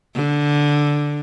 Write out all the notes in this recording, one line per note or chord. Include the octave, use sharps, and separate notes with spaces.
D3